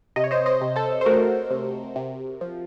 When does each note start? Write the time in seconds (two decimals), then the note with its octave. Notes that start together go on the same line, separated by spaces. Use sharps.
0.16 C3 D#5
0.24 C#5
0.31 C5 D#5
0.46 C5 D#5
0.61 C3
0.76 A4 C5
1.01 C5
1.05 A3 F#4 A#4
1.51 C3
1.96 C3
2.41 F3